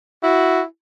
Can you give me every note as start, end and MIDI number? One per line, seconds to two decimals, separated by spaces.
0.23 0.63 64
0.23 0.61 66